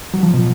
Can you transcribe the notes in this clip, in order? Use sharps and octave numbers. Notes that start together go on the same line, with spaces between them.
F#3
F3
B2